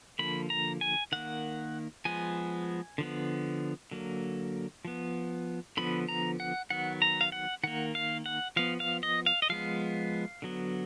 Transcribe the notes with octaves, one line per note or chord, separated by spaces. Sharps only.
D3 F3 A#3 B5
A#5
G#5
D#3 A#3 F#5
F3 G#3 B3 G#5
D3 F3 B3
D3 F#3 A#3
F3 B3
D3 F3 B3 B5
A#5
F#5
D#3 F#3 B3 F#5
A#5
F5
F#5
D#3 A#3 F#5
F5
F#5
F3 B3 F5
F5
D#5
F5
D#5
F3 G#3 B3 F5
D3 F#3 B3